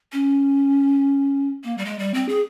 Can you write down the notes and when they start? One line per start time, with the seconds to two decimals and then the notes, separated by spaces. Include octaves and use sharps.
0.12 C#4
1.64 A#3
1.78 G3
1.85 G#3
1.99 G3
2.14 C4
2.29 G#4